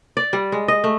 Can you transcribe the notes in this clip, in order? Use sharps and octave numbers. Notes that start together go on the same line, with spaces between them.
D5
G3
G#3
D#5
A3